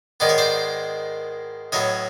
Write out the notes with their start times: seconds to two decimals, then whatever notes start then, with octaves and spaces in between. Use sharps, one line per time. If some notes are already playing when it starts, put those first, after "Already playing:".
0.20 G#2 D#3 G#3 B3 D5
0.29 C#5
0.38 C5 D5
1.72 A2 F#3 B3 C#5 D#5